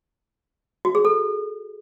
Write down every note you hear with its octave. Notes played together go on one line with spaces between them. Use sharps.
F#4
G#4
A4